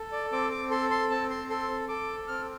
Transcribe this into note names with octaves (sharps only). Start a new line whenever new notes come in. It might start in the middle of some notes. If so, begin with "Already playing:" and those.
Already playing: A4
D5
C4 D6
D6
A4 C6
C6
C4 A5
C6
A4 C6
A4 D6
C4 F6